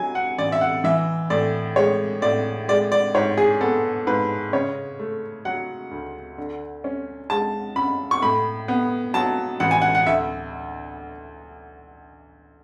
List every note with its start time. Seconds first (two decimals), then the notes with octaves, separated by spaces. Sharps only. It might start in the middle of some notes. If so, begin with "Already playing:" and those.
Already playing: F#3 G#5
0.15 F#5
0.38 A1 D5
0.52 E5
0.61 F#5
0.84 E3 E5
1.30 A2 D5
1.76 G#3 C#5
2.22 A2 D5
2.68 G#3 D5
2.92 D5
3.14 G#2 C#5
3.37 G#4
3.61 B3 A4
4.07 G#2 B4
4.53 C#3 C#5
4.99 A3
5.45 F#3 F#5
5.91 D2
6.38 D3
6.84 C#4
7.30 G#3 A5
7.76 F#2 B5
8.11 C#6
8.22 A2 B5
8.68 B3
9.14 F#3 A5
9.60 A1 F#5
9.71 G#5
9.82 F#5
9.95 F#5
10.06 D2 E5